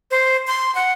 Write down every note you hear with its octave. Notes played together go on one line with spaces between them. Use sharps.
C5
C6
F#5